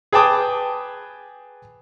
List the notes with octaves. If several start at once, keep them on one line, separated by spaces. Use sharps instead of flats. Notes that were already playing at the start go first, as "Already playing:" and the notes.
G#4 B4 G5 A5 D6 D#6